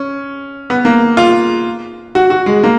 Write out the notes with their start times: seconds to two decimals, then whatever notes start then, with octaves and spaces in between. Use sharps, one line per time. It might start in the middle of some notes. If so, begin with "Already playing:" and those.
Already playing: C#4
0.70 B3
0.85 A#3
1.17 F4
2.15 F#4
2.30 F#4
2.46 G#3
2.64 A#3